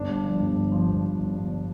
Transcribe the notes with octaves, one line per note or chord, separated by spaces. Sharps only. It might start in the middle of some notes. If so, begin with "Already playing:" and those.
Already playing: G1 D4
G2
F3
G1
G1
F3
G1
F3
G1
G1